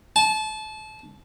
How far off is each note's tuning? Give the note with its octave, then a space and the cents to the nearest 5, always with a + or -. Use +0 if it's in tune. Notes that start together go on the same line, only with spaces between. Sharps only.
A5 -25